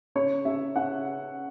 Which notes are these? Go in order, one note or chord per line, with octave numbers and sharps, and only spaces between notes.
C#3 C#5
C#3 E5
C#3 F#5